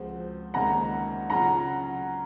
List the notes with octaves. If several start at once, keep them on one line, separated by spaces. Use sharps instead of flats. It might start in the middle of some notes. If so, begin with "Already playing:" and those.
Already playing: C#2 C#3 F3 C4 F#4
C#2 C3 D#3 A#3 C#4 F#5 A#5
C#3 F#3 C#4 F4 F#5 A#5